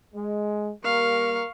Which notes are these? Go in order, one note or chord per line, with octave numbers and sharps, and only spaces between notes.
G#3
G3 A#3 A#4 F5 C#6